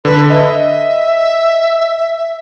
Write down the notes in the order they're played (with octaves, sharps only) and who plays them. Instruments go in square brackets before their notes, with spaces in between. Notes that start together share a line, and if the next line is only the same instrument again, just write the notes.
[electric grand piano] D3 [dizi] B4
[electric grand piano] D#5 [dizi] E5